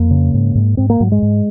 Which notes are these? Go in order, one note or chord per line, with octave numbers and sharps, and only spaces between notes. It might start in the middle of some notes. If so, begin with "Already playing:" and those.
Already playing: F2 A#3
C#3
G#2
G#2
G#2 C4
A#3
G#2 F#3
G#3
G#2